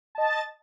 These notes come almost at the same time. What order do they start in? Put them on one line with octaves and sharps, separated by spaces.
A5 D#5 A6